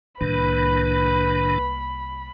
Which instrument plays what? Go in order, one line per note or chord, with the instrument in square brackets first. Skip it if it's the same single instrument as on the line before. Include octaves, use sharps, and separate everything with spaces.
[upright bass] C2 A#3 [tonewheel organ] A2 D#3 D4 [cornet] B4 [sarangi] B5